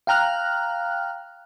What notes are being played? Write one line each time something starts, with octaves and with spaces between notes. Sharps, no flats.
F5 G5 A#5 F6 F#6